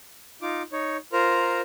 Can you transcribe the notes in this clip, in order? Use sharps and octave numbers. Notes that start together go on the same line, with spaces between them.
D#4 F4 D6
D#4 C#5
F4 A#4 C5 A#5